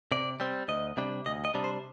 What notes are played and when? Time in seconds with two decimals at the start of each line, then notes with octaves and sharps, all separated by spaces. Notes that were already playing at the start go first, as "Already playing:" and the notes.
0.12 C3 D5
0.40 G3 C4
0.68 D2 D#5
0.97 C3 G3 D4
1.26 D2 D#5
1.45 D#5
1.54 C3 G3 D4
1.64 C5